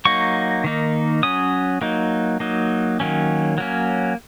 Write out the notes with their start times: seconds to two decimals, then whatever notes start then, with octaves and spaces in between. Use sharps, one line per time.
0.05 F#3 A#3 D#4 C#6
0.64 D#3 A#3 D#4
1.23 F#3 C#4 D#6
1.81 F#3 A#3 D#4
2.40 F#3 A#3 D#4
3.00 D#3 F#3 A#3 C#4
3.58 F#3 A#3 C#4